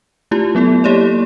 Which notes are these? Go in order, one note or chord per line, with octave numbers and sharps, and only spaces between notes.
A3 E4 F4 G4
F#3 B3 E4 A4
A#3 G4 C#5 D5